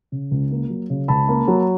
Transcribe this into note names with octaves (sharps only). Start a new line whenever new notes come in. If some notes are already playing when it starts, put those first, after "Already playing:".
C#3
C#2
A#3
F#3
C#3
C#2 A5 B5
A#3
F#3